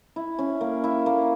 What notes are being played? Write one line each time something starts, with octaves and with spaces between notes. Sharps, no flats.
E4
C#4
A#3
E4
A#3